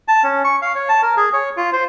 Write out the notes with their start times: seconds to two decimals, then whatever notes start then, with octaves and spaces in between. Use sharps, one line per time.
0.08 A5
0.24 C#4
0.44 C#6
0.62 F5
0.75 C#5
0.89 A5
1.03 A#4
1.17 G#4
1.33 C#5
1.57 F4
1.73 C5